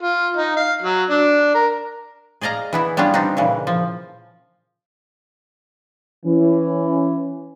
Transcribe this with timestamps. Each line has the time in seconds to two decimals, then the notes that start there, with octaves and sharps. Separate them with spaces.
0.03 F4
0.37 D#4
0.57 F5
0.82 F#3
1.10 D4
1.55 A#4
2.41 G#4 D5 D#5 F5 A#5
2.73 E3 B3 E4
2.97 G3 B3 C#4 D4 F4
3.14 C4 D4 D#4
3.37 A#2 C#3 E3
3.67 F3
6.26 E3 C#4